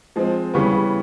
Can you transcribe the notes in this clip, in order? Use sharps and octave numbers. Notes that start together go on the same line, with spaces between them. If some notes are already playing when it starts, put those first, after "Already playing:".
F3 G#3 C4
C#3 E3 G3 B3